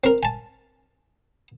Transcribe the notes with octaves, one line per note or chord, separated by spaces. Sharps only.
C4 A#4
G#5 A5